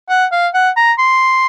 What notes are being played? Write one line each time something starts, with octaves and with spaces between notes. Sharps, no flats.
F#5
F5
F#5
A#5
C6